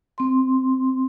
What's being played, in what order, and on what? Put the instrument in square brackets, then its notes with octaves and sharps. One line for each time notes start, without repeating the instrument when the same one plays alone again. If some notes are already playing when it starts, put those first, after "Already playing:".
[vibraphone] C4 C6